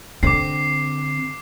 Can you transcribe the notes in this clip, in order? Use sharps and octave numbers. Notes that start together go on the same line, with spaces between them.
D3 C4 D6 C7